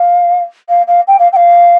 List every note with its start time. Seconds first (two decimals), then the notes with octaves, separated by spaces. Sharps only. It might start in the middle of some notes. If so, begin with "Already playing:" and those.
Already playing: F5
0.69 F5
0.87 F5
1.07 G5
1.19 F5
1.32 G5
1.36 F5